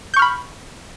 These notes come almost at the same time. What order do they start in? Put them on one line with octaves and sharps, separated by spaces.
G6 C#6 F6 B5